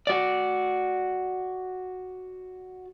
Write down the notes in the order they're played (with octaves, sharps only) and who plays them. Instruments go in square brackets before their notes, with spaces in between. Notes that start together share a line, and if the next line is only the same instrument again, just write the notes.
[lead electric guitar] F#4 D5